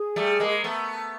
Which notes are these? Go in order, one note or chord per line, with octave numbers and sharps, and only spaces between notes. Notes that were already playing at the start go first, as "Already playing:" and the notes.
Already playing: G#4
G3 A3
G#3 A#3
A3 B3